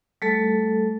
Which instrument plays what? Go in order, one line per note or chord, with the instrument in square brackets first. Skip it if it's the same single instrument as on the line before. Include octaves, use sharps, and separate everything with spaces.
[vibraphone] G3 A3 A4